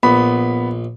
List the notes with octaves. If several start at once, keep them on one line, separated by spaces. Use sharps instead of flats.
A#1 B3 B5